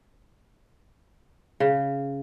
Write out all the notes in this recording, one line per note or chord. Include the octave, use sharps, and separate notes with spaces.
C#3